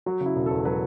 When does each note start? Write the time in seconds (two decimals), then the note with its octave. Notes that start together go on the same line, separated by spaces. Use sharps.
0.06 F#3 F#4
0.21 C#3
0.26 E4
0.35 E1
0.46 E2 A4
0.65 F#3 B4